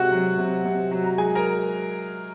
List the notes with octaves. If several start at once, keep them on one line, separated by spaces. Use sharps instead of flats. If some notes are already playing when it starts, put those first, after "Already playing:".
Already playing: C3 G#3 F#4 F#5
F#3
C3
C3
F#3
A#5
G#3 G#4 G#5
A#4 A#5